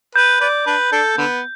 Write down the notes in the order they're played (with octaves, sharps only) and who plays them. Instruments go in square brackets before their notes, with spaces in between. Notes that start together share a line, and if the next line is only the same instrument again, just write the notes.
[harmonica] B4 [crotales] G6
[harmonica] B4 D5
D4 B4
D4 A4
D3 B3